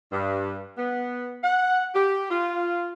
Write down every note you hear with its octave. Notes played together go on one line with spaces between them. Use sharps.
G2
B3
F#5
G4
F4